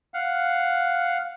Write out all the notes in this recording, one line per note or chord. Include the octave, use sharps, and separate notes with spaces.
F5 F#5